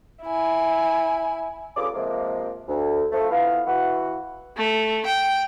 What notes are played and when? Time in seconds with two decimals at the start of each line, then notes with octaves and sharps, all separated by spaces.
0.22 E4 G#5
1.76 G2 D3 C#4 F4 G#4 D6
1.94 C3 F3 G#3 A#3
2.68 D2
3.12 F3 A3
3.30 E3 B3 E4 F4 F5
3.66 E3 F#4 F#5
4.57 A3
5.06 G5